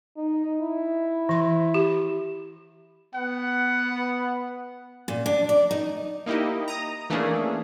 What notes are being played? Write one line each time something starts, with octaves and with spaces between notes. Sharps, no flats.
D#4
E4
E3 C6
G4
B3 F#5
A#2
D4
D5
D#4
A#3 D#4 E4 G4 D#5
A#5 D#6
E3 A3 A#3 C#4 D4 G#4